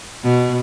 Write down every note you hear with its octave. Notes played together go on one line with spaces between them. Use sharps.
B2